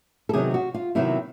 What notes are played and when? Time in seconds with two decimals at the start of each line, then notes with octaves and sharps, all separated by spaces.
0.29 A4
0.33 C3 D#3 F#3 B3 G#4
0.54 F#4
0.74 F4
0.95 C3 D#3 F#3 B3 E4